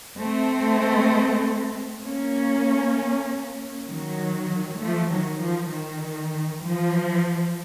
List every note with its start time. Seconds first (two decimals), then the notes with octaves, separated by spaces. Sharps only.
0.19 A3 C4
2.03 A#3 C#4
3.87 D#3 F#3
4.80 F3 A3
5.10 D#3 F#3
5.41 F3
5.72 D#3
6.64 F3